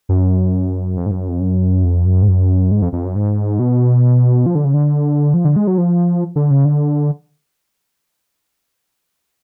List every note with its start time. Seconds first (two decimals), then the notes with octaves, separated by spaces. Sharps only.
0.09 F#2
0.97 F2
1.06 G#2
1.11 F#2
1.28 F2
1.40 F#2
1.84 F2
2.05 F#2
2.22 G#2
2.28 F#2
2.71 G#2
2.82 F2
2.93 F2
3.05 F#2
3.16 G#2
3.59 B2
4.46 F3
4.55 D3
4.65 C#3
4.74 D3
5.34 F3
5.45 D3
5.56 G#3
5.67 F#3
5.78 F3
6.36 D3
6.50 C#3
6.65 D3